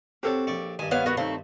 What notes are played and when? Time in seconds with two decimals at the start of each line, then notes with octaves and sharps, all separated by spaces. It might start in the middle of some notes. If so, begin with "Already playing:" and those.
0.23 C4 F#4 G4 A4 C#5 A5
0.47 A#1 D5 C#6
0.79 G2 D#3 G#5
0.91 B3 B4 C#5 F5
1.06 B3 F#4 A#4
1.17 A3 C4 D#4 C#5 F5